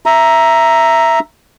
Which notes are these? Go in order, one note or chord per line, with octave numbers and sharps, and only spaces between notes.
E5 A#5